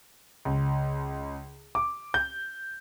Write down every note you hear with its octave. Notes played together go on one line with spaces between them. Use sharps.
C#2
D6
G6